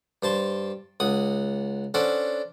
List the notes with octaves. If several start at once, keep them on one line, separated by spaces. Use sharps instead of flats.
G2 C5 A5 C6
C#2 F#5 D#6
C#4 D4 A4 C5 D5 F#5